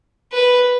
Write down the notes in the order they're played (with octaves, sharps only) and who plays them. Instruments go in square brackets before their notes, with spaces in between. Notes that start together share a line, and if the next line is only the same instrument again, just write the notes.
[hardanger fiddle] B4